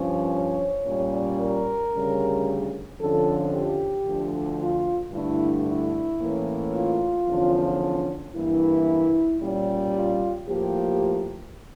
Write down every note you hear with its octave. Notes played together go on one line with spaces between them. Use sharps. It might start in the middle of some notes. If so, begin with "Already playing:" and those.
Already playing: G2 F3 C#4
C#5
A#2 G3 C#4
A#4
D2 C#3 G3 C#4
F2 D3 F3 C#4 A4
G4
D2 D3 F3
F4
G2 D3 A3 D4 E4
E4
A2 E3 A#3 C#4
F4
E2 D3 F3 C#4
G2 E3 A#3 E4
A#2 G3 C#4
F4
A2 F3 A#3 G4